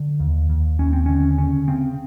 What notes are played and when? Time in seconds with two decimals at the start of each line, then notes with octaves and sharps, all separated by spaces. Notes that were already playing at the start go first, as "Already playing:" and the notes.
Already playing: D3
0.20 D#2
0.49 D#2
0.79 D#2 C#4
0.93 C4
1.06 D3 C#4
1.37 C#3 C#4
1.68 C#3 C4